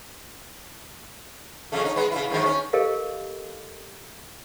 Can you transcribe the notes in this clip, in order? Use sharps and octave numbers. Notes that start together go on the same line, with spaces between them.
F2 C#3 A3
C#4 D#4
G#3 B3
C#3 E4
G#2 D#3 F#3
C#4
G4 A4 A#4 D#5 F5